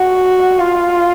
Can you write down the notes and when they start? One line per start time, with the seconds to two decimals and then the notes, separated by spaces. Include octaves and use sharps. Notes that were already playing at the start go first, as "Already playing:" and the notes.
Already playing: F#4
0.60 F4